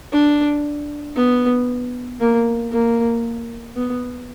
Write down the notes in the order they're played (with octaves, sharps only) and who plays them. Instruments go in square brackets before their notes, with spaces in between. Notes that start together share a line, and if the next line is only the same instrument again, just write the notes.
[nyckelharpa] D4
B3
A#3
A#3
B3